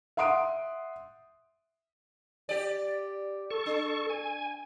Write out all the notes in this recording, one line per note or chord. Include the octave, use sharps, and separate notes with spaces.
E5 F#5 C6 D#6 D7
G4 D5
A4 C#6
D4
G#5